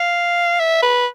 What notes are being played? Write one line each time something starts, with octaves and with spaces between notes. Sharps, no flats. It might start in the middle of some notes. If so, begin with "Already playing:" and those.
Already playing: F5
E5
B4